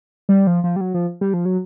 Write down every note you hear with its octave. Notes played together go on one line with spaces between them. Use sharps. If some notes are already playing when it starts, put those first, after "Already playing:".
G3
F3
F3
G3
F#3
F3
G3
F3
F#3